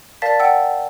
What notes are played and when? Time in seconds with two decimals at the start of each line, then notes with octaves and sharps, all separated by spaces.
0.22 A#4 D5 F5 A5 A6 B6
0.40 F#5 G5 E6